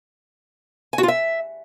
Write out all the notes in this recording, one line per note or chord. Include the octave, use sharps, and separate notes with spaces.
G#5
F#4
F4
E5